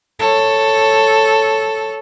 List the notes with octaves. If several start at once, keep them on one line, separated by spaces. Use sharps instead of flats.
A4 C#5